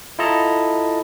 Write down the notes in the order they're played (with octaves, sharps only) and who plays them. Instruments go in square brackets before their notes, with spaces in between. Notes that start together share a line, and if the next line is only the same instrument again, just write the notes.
[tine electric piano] E4 F4 A4 D#5 A5 A#5